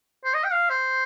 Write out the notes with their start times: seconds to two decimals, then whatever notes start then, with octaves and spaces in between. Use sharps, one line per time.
0.24 C5
0.34 D#5
0.44 G5
0.52 F5
0.70 C5